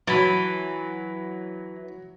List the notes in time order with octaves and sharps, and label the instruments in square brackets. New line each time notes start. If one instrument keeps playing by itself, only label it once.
[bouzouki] E3 [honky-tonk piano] F#3 [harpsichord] A5 B5